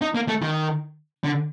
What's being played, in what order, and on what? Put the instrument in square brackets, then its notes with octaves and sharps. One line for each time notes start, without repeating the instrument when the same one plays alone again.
[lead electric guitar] D#4
A#3
A3
D#3
D3